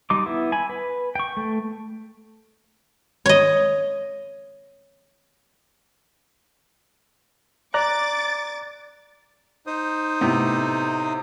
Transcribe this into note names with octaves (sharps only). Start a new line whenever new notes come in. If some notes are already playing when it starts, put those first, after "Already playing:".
G3 D#4 C6 D6
B3 E4
G#5 B5
B4
G5 C#6
A3
C#5 D#5
D5 A#5 D6 F#6 A6
D#4 C5 D#6
A2 C3 B3